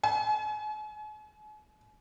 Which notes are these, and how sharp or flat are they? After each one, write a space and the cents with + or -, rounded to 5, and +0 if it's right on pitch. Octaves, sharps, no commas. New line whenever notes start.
G#5 +40